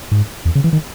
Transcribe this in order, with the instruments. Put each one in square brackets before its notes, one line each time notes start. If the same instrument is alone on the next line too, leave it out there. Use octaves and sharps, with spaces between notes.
[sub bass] G#2
E2
C#3
E3
D#3